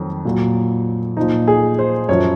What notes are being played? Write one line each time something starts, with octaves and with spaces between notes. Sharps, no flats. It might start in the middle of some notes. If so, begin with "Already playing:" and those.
Already playing: F2 D#3 F#3
A#2 F#3
A#2 F3 D#4
G#4
C5
F#2 F3 C#5